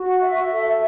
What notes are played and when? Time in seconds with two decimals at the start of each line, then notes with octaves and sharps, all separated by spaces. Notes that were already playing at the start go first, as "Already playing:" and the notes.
Already playing: F#4
0.21 E5
0.51 A4